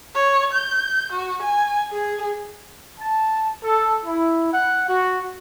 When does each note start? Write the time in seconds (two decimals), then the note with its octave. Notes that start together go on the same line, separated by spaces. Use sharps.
0.15 C#5
0.53 G6
1.12 F#4
1.42 G#5
1.91 G#4
3.00 A5
3.63 A4
4.05 E4
4.53 F#5
4.88 F#4